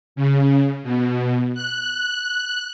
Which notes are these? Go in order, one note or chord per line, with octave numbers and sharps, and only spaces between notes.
C#3
B2
F#6